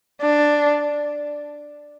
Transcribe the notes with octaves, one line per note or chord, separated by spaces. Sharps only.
D4